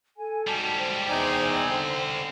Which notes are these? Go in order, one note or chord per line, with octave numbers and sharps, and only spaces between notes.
A4 G#5
G#2 G3 F#4 A5
C5 G5
E2 C4 D#4 D5 G#5
D3